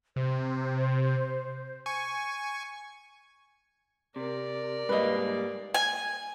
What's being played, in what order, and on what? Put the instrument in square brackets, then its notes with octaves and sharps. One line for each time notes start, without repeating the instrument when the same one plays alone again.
[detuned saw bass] C3 [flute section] C5
[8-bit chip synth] G#5 C#6
[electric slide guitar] C3 [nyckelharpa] A#4 D5
[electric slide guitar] G#2 G3 A#3 [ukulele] B4 D#5
[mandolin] G#5